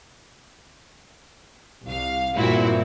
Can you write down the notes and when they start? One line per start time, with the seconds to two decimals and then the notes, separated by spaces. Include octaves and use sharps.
1.85 C2 F5
2.36 G2 A#2 E3 C4 E4 F#4